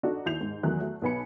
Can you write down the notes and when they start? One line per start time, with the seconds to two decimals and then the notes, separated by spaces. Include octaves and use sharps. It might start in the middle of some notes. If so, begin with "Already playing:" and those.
0.03 D4 D#4 F#4 A4 D5 D#5
0.26 D#2 E4 G6 C7 F7
0.41 G#2
0.63 E2 D#3 F#3 A3 F#6
0.80 A3 F#4
1.02 B1 B2 B3 G#5 B5 C#7